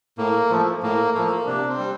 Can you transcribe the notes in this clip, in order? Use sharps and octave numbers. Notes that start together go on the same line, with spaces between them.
A2 A#3
F3 A3
A2 A#3
F3 A3 A#3
C3 D4
C4
G3